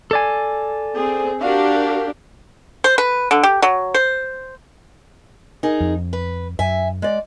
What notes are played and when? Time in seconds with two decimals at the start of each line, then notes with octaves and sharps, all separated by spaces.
0.11 A4 D5 G#5
0.95 C4 G#4
1.41 D4 F#4 G4 A#4 F5
2.84 C5
2.98 B4
3.31 D3
3.43 G4
3.62 F#3
3.94 C5
5.63 D#4 G#4 A#4
5.80 F2
6.13 B4
6.59 F#2 E5 G#5
7.02 G#3 D5